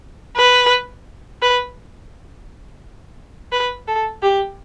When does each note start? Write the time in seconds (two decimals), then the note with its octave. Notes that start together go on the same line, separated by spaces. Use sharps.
0.37 B4
1.42 B4
3.52 B4
3.88 A4
4.23 G4